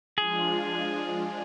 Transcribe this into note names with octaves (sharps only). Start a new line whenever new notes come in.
F3 G#3 D4 F4 G#4